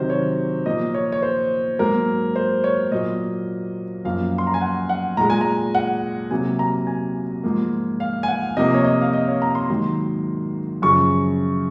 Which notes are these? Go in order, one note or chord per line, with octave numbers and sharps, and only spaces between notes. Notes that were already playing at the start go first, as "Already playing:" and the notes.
Already playing: C3 D#3 F#3 C5
C#5
A#2 F3 A#3 D#5
C#5
C#5
C5
G#2 F#3 A#3 A#4
C5
C#5
A#2 F#3 A#3 D#5
F#2 F3 A#3 F5
C6
A#5
G#5
F#5
F#5
A#2 G#3 A#5
G#5
A#5
F#5
C3 F#3 A#3 G#5
A#5
G#5
G#2 F3 A#3
F5
G#5
F#5
C3 F3 A#3 D#5
C#5
D#5
F5
D#5
C#5
A#5
C6
G#2 D#3 F#3 A#3
F#2 C#3 F3 C#6